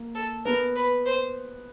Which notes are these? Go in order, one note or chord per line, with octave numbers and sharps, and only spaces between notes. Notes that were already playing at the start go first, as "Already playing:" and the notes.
Already playing: A#3
A4
B3 A#4
B4
C5